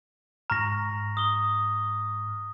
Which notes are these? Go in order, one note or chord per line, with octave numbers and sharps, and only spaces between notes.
G#2 A#5 C#6 F6 A#6
D#6 G7